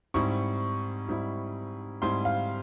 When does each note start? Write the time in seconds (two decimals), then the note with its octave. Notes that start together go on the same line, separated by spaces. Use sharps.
0.14 G#2 G3 C4 E4 C#6
1.08 G#2 G3 C4 E4
2.02 G#2 G3 C4 E4 C6
2.25 F5